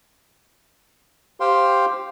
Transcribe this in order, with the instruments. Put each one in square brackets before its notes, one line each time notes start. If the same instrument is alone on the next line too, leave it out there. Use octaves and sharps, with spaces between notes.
[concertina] G4 C5 F5 G5 C6